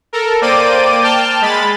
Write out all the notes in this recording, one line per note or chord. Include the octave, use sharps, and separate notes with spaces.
A4 A#4
A#3 C5 D5 G5 D6 D#7
G5 A5 F6 G6
G#3 B5 A6